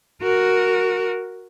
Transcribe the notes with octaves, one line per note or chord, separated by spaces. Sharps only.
F#4 A#4